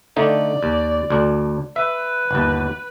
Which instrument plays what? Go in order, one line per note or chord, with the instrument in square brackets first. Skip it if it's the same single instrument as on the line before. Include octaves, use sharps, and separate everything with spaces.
[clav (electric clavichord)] D3 A3 D#4 [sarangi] D5
[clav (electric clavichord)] D#2
D2 D4
[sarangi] B4 [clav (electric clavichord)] E5
[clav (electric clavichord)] G1 D#2